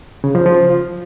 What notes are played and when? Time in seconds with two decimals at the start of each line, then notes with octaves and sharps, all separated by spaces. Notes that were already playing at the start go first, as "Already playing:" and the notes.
0.24 C#3
0.35 F3
0.46 F3